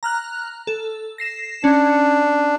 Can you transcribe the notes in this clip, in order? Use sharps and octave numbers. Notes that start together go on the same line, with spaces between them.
A#5 F6 F#6
A4
A#6 C7 E7
C#4 D4